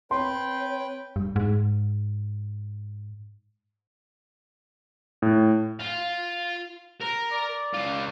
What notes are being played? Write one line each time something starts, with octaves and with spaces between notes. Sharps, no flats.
C4 B4 C#5 G5 C6
G2
G#2
A2
F4 F5
A#4
D5
C#2 F4